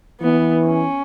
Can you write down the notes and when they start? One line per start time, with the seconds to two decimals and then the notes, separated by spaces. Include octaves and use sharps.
0.21 E3 B3
0.67 C#4